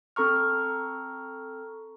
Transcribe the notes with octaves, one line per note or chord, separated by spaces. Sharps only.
C4 A4 A#5 C#6 F6